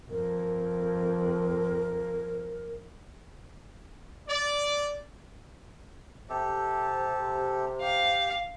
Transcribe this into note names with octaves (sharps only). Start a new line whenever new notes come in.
F2 A#4
D5
C3 G4 A4
G4 F5